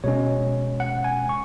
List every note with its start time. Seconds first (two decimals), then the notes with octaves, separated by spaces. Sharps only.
0.04 B2 G#3 C#4 C#5
0.80 F#5
1.04 G#5
1.29 C#6